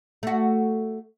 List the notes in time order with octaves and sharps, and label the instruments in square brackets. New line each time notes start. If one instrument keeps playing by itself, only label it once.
[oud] A3 F#4